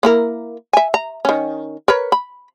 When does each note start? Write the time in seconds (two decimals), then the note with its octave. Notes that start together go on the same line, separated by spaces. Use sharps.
0.03 A#3 E4 A#4
0.73 E5 G#5
0.94 A#5
1.25 D#3 C#4
1.88 A#4 B4 C#5
2.12 B5